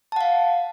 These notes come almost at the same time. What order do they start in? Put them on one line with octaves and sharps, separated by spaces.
A5 F#5 F5